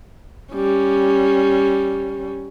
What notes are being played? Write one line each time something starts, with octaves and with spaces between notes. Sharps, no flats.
G3 C#4